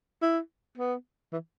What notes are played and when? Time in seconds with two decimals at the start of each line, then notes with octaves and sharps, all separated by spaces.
0.22 E4
0.78 B3
1.32 E3